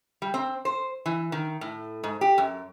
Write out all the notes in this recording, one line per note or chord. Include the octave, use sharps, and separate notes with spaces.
G3
C4
C5
E3
D#3
A2
G#2
G4
F#2